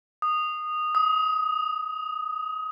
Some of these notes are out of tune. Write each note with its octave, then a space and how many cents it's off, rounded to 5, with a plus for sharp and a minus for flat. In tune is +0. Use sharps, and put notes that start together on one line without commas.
D#6 -15
D#6 +25